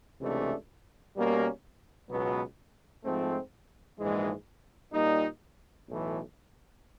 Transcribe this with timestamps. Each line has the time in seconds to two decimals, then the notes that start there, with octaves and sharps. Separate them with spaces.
0.21 C#2 C3 E3 A3 D4
1.15 B2 G3 A#3 C#4
2.10 C#2 B2 F#3 B3
3.04 G#2 F3 A3 C4
3.99 A#1 G#2 E3 G#3
4.93 A#2 G3 A#3 D#4
5.88 B1 A2 E3